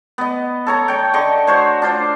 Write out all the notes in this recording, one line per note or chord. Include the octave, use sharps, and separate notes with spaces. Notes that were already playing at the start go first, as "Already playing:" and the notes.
B3 D#5
A4 C#5 A#5
C#5 G5
D3 D#5 C#6
F#4 C5 C#5
D4 F4 C5 D5